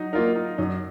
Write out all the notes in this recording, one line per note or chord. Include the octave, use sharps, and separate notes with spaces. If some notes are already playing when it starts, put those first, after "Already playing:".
Already playing: F#3 D#4
A#3 D#4 F4 A#4
D#4
F#2 D#4